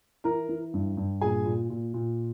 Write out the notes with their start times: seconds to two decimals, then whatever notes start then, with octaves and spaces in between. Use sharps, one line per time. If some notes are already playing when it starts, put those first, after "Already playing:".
0.24 E3 A#4 A#5
0.49 E3
0.74 G2
0.97 G2
1.21 A#2 G#4 G#5
1.45 A#2
1.70 A#2
1.94 A#2